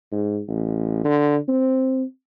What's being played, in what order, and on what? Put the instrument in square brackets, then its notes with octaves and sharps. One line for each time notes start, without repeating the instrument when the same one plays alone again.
[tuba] G#2
A1
D3
C4